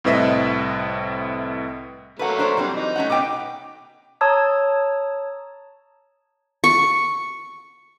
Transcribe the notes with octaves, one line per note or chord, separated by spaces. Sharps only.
C2 A2 C4 B4 D#5 E5
F#3 A3 A#3 B4 F#5
D4 C5 C#5
E3 F#3 G3 C4
D#4
A3 C#4 F#5
B2 B3 D#4 G5 D6
C#5 A5 A#5 D#6 E6 G#6
C#6